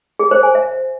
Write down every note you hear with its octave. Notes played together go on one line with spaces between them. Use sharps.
G#4
C5
G#5
E5